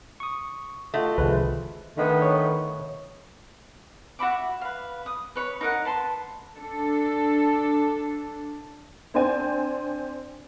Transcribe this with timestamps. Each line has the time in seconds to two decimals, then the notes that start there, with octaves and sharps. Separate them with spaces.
0.20 C#6 D#6
0.94 A3 F4 F#4 D#5
1.18 C2 D3 D#3 F3 G#3 B4
1.97 D3 D#3 A3 B3
2.22 C#5
4.19 F#4 E5 B5 D6
4.61 B4 F5
5.06 D#6
5.36 B4 C#5 B5
5.61 D#4 A#4 F#5
5.85 B4 A5 C6
6.55 D4 A4
9.14 C4 D4 C5 D5 G5 G#5